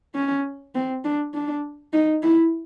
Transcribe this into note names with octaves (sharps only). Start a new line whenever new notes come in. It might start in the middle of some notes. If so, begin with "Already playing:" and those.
C#4
C4
D4
D4
D#4
E4